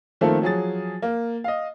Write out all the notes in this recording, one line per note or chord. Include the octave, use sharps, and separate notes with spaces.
D#3 F3 A3 A#3 C4 A4
F3 F#3 G#4 A6
A#3
D#5 F5